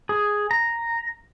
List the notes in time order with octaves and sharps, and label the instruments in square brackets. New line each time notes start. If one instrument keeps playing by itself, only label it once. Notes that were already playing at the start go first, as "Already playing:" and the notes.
[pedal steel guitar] G#4
A#5